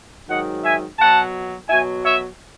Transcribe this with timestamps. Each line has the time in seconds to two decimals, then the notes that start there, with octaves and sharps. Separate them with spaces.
0.28 G#2 D#3 F#3 D#5 F#5
0.64 E5 G#5
0.99 B2 F#3 F#5 A5
1.69 B2 F#3 E5 G#5
2.04 C#5 E5